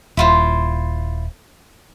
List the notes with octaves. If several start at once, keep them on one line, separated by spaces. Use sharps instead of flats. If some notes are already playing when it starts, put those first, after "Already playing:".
D#1 E4 F4 C5